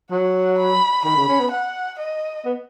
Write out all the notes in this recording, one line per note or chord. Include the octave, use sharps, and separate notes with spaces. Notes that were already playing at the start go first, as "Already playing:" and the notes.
F#3 F#5
B5
D#3 B5
C#3
C#4
B3
F#5
D#5
B3